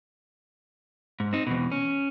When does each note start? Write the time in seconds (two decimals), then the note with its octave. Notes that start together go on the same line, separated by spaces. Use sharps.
1.20 G#2
1.33 C4 D#4
1.47 E2 B2
1.72 C#4